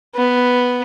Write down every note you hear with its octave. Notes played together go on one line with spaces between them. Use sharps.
B3